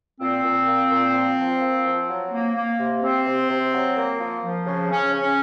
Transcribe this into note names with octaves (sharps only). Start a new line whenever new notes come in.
A#2 C4
A#2
A#3
A#2
F3
F3
A#3
F3
F#3
A#3
A#3
C3
C3 C4
C3
C3
F#3
A#3
F3
F3
C#3
C#3 C#4
C#3
C#4